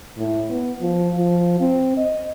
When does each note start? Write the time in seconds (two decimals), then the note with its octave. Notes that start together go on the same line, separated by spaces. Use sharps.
0.18 A2
0.50 B3
0.81 F3
1.15 F3
1.61 C4
1.98 D#5